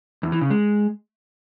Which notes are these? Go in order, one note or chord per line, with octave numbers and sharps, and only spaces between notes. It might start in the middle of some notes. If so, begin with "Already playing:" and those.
E2
E3
C#3
G#3